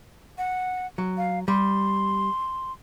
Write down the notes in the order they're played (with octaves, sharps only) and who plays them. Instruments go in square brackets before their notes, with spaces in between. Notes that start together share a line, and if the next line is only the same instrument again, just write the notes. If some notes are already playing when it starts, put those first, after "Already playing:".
[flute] F#5
[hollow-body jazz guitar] F#3
[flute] F5
[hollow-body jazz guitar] G3 [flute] C6